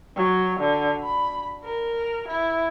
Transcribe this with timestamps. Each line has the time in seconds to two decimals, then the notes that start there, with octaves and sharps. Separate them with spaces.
0.16 F#3
0.60 D3
1.03 B5
1.64 A#4
2.28 E4